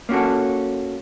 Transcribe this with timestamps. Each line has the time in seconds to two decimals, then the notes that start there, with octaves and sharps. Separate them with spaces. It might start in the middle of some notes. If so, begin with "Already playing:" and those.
0.09 A#3 C#4 F#4 A4